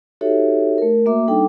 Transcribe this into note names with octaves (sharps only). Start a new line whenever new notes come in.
D#4 F#4 G4 A4 C#5 E5
A3 A#4
A#3 F#4 E5 D6
G3 D4 D#4 A4 G5 D6